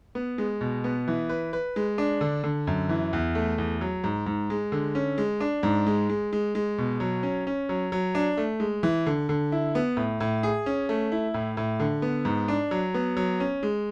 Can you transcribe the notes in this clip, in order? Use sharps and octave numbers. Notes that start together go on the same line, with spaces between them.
B3
G#3
B2
B3
E3
B4
B4
G#3
D4
D3
D3
F#2
E3
E2
A3
E2
F#3
G#2
G#2
G#3
D3
C#4
G#3
D4
G#2
G#3
G#3
G#3
G#3
B2
F#3
C#4
C#4
F#3
F#3
D4
A3
G#3
E3
D3
D3
E4
B3
A2
A2
G#4
C#4
A3
E4
A2
A2
D3
B3
G#2
D4
F#3
B3
F#3
C#4
G#3